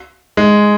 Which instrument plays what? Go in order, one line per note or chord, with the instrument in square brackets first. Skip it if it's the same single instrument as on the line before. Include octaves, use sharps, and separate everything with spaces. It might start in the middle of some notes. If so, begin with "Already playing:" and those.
[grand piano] G#3